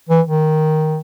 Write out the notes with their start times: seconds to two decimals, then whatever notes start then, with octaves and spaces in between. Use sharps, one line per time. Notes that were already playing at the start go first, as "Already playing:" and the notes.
0.09 E3
0.27 D#3